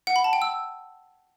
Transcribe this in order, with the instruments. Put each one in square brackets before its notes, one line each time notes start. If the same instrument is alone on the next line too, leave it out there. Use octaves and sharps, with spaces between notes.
[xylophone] F#5
B5
A5
G5
E6